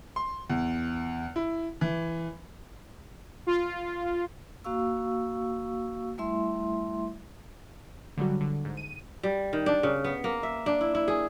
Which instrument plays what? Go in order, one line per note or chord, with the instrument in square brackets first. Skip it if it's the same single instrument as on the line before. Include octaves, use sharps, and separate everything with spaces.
[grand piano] C6
E2
E4
E3
[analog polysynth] F4
[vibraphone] A#3 F#4 F5 C#6 E6
G3 A3 E4 E5 C6
[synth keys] D3 F#3 G3 F#4
D3
G#2
D#7
[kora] G3
D#3
D4
C#3
B3
A#3
E5
D4
E4
E4
G#4